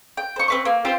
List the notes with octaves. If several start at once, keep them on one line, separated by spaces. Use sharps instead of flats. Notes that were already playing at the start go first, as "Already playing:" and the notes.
G5
C5 C#6
C4 B4 C#6
A#3
C4 F4 G4 C5